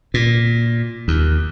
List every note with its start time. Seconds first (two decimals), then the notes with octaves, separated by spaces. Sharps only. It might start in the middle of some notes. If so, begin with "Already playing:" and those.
0.14 A#2
1.08 D#2